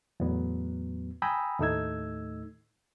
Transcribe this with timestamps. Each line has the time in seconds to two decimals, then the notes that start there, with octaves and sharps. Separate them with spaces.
0.20 E2 A2 F#3 B3
1.22 G5 G#5 A#5 B5 D#6 E6
1.59 D#2 A2 A3 D#4 E6 G#6